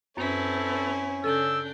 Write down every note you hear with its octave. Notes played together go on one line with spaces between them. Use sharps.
F#2 C4 C#4 E4 A4 B4
C#3 D4 A4 E6 G6